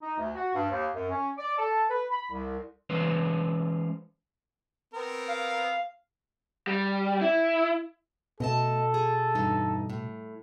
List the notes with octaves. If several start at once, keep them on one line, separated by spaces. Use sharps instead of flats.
D#4
D2
F#4
G2
D#2
F#2
C#4
D5
A4
B4
B5
C2
E3 G#3 C#4 B4 C5
B3 C4 A#4
F5
G3
E4
B2 A3 A4 D#5 A5
G#4
E2 G2 D#4
A2